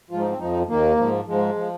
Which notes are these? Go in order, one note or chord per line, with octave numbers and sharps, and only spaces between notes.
G#2 F3 F4
D#4
C4
F2 F3 D#4
D#2 D#3 A#3
G#2 F3
G#2 F3 G#3
F3